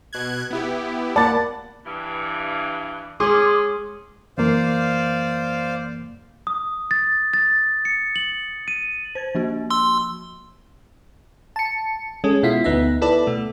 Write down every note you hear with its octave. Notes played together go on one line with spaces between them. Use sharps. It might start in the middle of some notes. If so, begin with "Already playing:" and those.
B2 F#6 G#6
B3 E4 G4
A#3 D5 F#5 A5 B5 A6
G2 E3
G#3 C#4 G#4 C6 D6 D#6
F#2 E3 A#3 C5 D5 F5
D#6
A6
A6
C#7
F#7
D#7
C5 G#6 A6
F3 A#3 F#4
C6 E6
A5 C#7
G#3 C#4 A4
B2 E4 F4 B6
D2 B3 D#4 E5
E4 A4 B4 D5
B2 A3